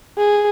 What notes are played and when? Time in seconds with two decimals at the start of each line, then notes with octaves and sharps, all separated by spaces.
0.18 G#4